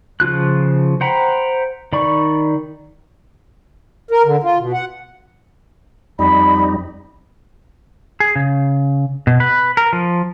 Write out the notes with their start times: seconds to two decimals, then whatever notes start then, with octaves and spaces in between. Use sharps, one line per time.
0.20 C#3 F3 F4 F#6
1.01 C5 F#5 G5 A#5 B5
1.93 D#3 D5 B5 C#6
4.11 A#4
4.25 D3
4.43 F4
4.59 B2
4.73 F#5
6.19 F2 G3 D#4 B5
8.20 G#4
8.36 C#3
9.27 B2
9.40 B4
9.77 A#4
9.93 F3